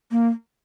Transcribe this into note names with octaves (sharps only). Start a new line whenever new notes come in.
A#3